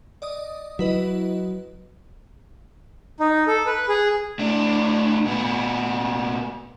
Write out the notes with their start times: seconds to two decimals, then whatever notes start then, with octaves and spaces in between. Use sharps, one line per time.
0.22 D5 D#5 D#6
0.79 F#3 E4 B4 D#5
3.20 D#4
3.47 A4
3.66 B4
3.88 G#4
4.39 A2 D4
5.25 A#2 B3